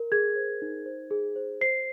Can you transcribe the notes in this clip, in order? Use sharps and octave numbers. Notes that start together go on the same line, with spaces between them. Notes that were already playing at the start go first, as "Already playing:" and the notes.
Already playing: A#4
G#4 G#6
C5
D#4
C5
G#4
C5
C5 C7